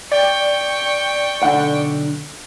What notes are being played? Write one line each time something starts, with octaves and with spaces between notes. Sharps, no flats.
D5 G5 C#6
B1 D3 F#5